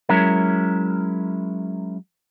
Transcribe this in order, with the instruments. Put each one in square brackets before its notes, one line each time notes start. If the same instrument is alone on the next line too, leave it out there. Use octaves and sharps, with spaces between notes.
[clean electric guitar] F#3 G#3 C#4 E4 A#4